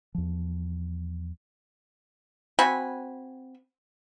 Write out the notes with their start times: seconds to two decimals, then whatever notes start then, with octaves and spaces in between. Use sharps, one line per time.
0.15 E2 F3
2.59 C4 F#4 G#5 B5